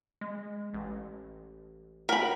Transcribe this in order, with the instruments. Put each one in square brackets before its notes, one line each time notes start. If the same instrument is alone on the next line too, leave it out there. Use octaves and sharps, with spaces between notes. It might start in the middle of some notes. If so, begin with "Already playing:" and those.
[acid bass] G#3
A1
[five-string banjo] A#4 B5 [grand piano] F#5 G5 B6